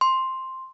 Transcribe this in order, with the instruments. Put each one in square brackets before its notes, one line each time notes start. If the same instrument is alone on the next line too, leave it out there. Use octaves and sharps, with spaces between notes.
[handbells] C6